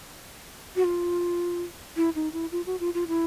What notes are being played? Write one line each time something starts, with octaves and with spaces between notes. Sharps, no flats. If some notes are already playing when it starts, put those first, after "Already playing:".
F#4
F4
E4
D#4
E4
F4
F#4
F4
F4
E4